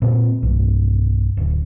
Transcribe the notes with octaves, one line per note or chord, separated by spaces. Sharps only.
A#2 C4
B1 G2
D1